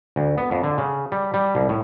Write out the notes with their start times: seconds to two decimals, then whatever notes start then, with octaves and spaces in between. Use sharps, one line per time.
0.16 D2
0.38 B3
0.51 F2
0.64 D3
0.78 C#3
1.12 G3
1.34 G3
1.55 C2
1.69 A2